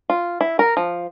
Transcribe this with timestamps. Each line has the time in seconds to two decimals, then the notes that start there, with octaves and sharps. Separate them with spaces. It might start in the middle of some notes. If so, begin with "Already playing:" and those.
0.10 F4
0.41 E4
0.59 A#4
0.77 F3